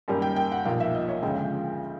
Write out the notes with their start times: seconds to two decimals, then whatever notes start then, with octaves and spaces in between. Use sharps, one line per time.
0.08 F#2 D#3 G3 A#3 G5
0.22 G5
0.36 G5
0.52 F#5
0.65 B1 A#2 F3 A#3 F5
0.80 E5
0.94 D#5
1.09 C#5
1.23 D2 C#3 F3 G#3 G5